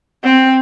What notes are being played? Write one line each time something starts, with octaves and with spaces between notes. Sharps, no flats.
C4